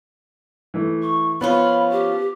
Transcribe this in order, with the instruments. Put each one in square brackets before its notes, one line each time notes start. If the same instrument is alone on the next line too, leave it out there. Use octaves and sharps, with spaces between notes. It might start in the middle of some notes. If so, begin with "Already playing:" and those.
[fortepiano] E3 A3
[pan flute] C#6
[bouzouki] F3 C#4 F4 [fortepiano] B3 [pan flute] B5
[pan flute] G4